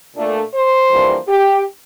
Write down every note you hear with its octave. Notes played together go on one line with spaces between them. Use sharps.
A#2 A3 D4
C5
F2 E3 G3 A#3 D4
G4